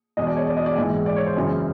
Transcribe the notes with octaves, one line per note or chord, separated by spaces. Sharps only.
E1 E2 B2 D#5
D5
C#5
D5
D#5
D5
A#1 G#2 E3
D5
C#5
C5
G#1 F#2 C#3 E3